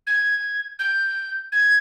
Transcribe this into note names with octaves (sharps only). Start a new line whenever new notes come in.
G#6
G6
G#6